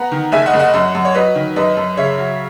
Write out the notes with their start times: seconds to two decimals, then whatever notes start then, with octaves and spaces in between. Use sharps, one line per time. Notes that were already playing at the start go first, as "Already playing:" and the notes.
Already playing: B3 F#5 A#5
0.11 D#3
0.32 F#1 E5 G#5
0.46 D#5 F#5
0.53 F#1
0.59 D#5 F#5
0.74 F#2
0.95 F#2
1.05 C#5
1.15 F#3 B4 D#5
1.35 D#3
1.56 F#2 B4 D#5
1.77 F#2
1.97 C#3 C#5 E5
2.18 F#3